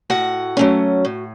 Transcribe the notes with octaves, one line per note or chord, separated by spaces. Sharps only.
A2 F#4 F#5
F#3 A3 C#4
A2